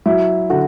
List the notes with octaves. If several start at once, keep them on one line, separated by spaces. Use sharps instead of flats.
F#3 E4
D3 F#4